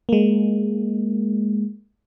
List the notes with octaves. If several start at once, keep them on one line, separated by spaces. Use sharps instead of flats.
G#3 A#3